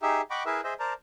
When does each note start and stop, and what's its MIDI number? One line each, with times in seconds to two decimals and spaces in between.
0.02 0.21 63
0.02 0.21 67
0.02 0.21 68
0.02 0.21 76
0.30 0.43 75
0.30 0.43 78
0.30 0.43 79
0.30 0.43 83
0.30 0.43 85
0.30 0.43 86
0.46 0.61 64
0.46 0.61 68
0.46 0.61 70
0.46 0.61 71
0.46 0.61 76
0.64 0.74 68
0.64 0.74 72
0.64 0.74 75
0.64 0.74 76
0.80 0.93 70
0.80 0.93 72
0.80 0.93 74
0.80 0.93 81
0.80 0.93 82